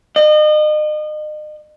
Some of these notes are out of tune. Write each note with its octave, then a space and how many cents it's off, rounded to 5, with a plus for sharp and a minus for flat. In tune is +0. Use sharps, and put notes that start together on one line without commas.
D#5 -35